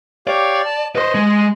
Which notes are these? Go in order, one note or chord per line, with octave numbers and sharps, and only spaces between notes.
G4 C#5 D5 F5
A5
B4 C5 D#5
G#3